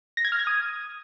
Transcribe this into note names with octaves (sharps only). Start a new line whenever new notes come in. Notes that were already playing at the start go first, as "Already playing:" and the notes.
A#6
G#6
F6
G#6
D#6